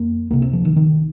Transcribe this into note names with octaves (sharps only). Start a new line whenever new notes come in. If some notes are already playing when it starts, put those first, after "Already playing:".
Already playing: F2 A#3
C#2 C3 A#3
C4
F3
D#3
D#3